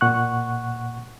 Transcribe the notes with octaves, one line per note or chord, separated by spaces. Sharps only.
A#2 F#5 C#6 F#6